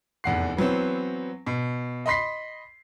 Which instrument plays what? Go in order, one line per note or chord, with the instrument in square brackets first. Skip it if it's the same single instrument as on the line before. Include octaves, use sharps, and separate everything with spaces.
[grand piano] F1 E2 F#5 C7
E3 F#3 B3 C4
B2
D#5 B5 C6 B6 C7